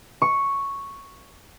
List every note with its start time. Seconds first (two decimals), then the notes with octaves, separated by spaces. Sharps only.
0.22 C#6